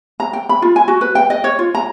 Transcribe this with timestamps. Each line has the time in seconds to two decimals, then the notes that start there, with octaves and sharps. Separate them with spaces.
0.20 A#5
0.33 G5
0.49 B5
0.62 F4
0.76 G#5
0.88 F#4
1.01 B4
1.15 G5
1.30 D#5
1.44 C#5
1.59 F4
1.75 A#5